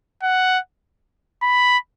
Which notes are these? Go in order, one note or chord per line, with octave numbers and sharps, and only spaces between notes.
F#5
B5